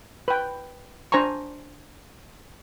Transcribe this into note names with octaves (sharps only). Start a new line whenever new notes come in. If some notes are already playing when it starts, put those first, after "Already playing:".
B4 G5
D4 C5 G#5 A#5 C#6